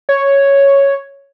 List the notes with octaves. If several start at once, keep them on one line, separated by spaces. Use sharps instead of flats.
C#5